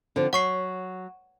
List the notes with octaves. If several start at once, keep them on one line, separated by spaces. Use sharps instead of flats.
D3 F3 C4
F#3 F#5 C#6 C7